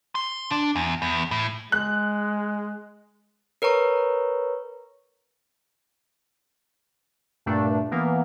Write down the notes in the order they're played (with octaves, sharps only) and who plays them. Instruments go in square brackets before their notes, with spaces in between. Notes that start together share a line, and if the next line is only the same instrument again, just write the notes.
[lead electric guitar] C6
D4
E2
E2
A2
[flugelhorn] G#3 [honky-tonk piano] F#6
[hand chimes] A#4 B4 C#5 A#5 C#6
[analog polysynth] G2 A#2 A3 D4
E3 A#3 B3